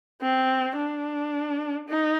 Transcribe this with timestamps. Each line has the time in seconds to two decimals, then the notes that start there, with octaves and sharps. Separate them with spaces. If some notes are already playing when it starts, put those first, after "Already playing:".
0.21 C4
0.76 D4
1.89 D#4